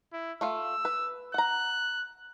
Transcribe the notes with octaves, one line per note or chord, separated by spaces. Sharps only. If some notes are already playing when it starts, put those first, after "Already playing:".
E4
A3 F4 F5 E6
B4
F#5 A#5 F#6